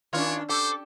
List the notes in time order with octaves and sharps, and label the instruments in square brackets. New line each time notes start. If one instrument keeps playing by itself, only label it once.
[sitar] D#3 C#4 D4 [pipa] E4 F4 [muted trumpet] C#5
[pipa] G4 [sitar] A4 [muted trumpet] C5 [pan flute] D6